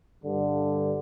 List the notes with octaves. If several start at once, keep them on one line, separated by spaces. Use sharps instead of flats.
G2 D3